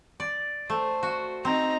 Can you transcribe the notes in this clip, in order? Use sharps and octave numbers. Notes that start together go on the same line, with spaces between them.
D5
A3 C5
F#4
C4 D#4 A#5